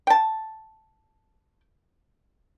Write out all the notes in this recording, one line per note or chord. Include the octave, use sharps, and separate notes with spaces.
G5 A5